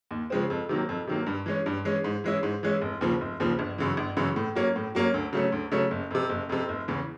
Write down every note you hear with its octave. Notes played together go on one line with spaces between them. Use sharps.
D#2
C#3 F3 G#3 C4
F2
C3 D#3 F#3 A#3
F2
C3 D#3 F#3 A#3
G2
E3 G#3 C#4
G2
E3 G#3 C#4
G#2
E3 G#3 C#4 E4
G#2
E3 G#3 C#4 E4
F1
D#2 C#3 F3
F1
D#2 C#3 F3
G1
F#2 C#3 E3
G1
F#2 C#3 E3
A2
F#3 A#3 C#4
A2
F#3 A#3 C#4
D2
C#3 F#3 A3 C#4
D2
C#3 F#3 A3 C#4
F#1
F2 C3
F#1
F2 C3
F1
E2 C#3 E3